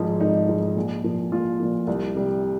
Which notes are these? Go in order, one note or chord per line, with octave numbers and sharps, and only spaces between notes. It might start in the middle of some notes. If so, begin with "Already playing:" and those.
Already playing: G#1 G#2 F3
G#1 D#4
G#2 F3
A#1
A#2 F3
A#1 F4
A#2 F3
C2
C3 G3